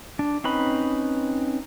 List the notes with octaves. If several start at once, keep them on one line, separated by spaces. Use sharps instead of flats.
D4
C4 C#4 D#4 B4 B5